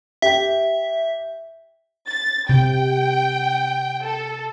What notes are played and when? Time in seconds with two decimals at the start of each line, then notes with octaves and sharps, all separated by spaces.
0.22 G4 E5 G5
2.09 A6
2.49 C3 G5
4.06 A4